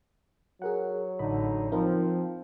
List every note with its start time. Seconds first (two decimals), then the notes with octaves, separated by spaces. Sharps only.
0.62 F#3 G#4 A#4 F#5
1.19 A1 D3 D#4 D#5 B5
1.72 F3 C4 D#4 A#4